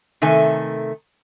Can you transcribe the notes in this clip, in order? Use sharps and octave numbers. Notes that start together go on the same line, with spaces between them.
C3 D#3 A3 G#5